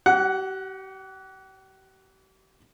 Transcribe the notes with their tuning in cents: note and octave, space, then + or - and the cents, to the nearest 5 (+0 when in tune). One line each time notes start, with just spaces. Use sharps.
G4 -40 F#5 +5